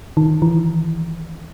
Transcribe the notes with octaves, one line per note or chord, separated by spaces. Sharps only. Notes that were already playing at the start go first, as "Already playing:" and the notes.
D#3
E3